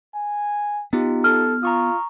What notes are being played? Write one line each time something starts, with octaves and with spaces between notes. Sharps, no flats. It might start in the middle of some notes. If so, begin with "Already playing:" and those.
G#5
B3 D#4 F4 G4
A4 F6
F4 A#5 C#6 D#6